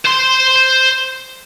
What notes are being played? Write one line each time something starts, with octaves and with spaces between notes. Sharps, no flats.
C5 C6